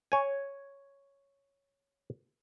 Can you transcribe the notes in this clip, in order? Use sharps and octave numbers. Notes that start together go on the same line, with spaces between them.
C#5 G#5